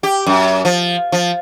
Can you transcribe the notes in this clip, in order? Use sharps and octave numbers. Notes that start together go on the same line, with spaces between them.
G4
F#2
F3
F3